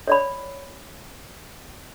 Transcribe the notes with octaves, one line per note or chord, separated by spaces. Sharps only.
C#5 D5 B5